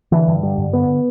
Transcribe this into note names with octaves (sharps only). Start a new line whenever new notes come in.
D3 E3
G2
D3 G3
G2
D3 B3